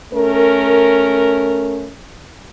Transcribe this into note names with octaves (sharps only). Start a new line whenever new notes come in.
A3 C#4 A#4